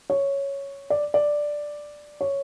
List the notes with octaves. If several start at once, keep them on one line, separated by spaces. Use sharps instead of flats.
C#5
D5
D5
C#5